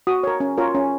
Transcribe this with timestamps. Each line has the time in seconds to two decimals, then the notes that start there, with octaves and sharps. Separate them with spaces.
0.07 F#4 D#6
0.23 A#4 C#5
0.40 C#4
0.58 F4 A#4 C#5
0.75 C#4